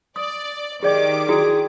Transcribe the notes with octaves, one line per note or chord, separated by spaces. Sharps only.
D5 D#6
D#3 G4 G#4 D5 D#5 D6
E4 F#4 G#4 G5